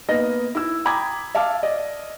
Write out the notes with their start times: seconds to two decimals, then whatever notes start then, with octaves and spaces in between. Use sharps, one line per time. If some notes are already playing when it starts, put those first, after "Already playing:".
0.09 A#3 B3 D#5 A#6
0.55 E4 E6
0.85 G5 A#5 B5 D6 D#6 G#6
1.35 E5 F5 A5 D6 F6
1.63 D5 D#5